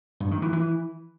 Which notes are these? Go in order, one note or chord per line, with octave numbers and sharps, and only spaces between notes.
G2
D#3
E3
E3